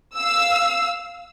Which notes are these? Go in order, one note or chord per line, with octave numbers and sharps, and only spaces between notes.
F5 E6